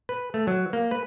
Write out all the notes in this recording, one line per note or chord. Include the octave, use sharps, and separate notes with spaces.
B4
A3
F#3
A#3
B4